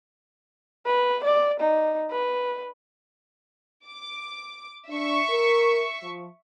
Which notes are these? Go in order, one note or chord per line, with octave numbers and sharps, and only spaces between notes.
B4
D5
D#4
B4
D6
D4 E5 C#6
A#4
F3